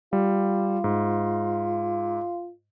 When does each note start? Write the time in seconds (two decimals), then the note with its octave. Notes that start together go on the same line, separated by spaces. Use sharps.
0.13 G3 F4
0.84 G#2